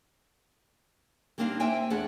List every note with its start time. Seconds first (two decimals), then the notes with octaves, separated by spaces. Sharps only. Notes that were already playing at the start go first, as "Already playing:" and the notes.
1.38 G3 A#3 C4 D4 D#4 F5
1.60 A#3 C4 C5 E5 G5 G#5
1.90 E2 A3 D4 G#4 F#5